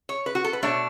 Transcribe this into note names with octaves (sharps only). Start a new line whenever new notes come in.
C#5
B4
F#4
A4
B4
B2 A3 D4 C#5